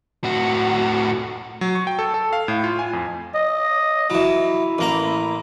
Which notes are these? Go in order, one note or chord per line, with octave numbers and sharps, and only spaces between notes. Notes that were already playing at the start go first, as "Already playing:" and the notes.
A2 F#4
F#3
C#6
G5
A4
A4
F5
A2
F4
G#5
F2
D#5
E3 F#3 E4
A1 A#3 A#5